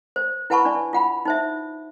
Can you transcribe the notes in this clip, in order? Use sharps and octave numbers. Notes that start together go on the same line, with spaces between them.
C5
E4 B4 F#5 A5 B5 C#6
D4 D5
F4 F#5 B5
D#4 C5 E5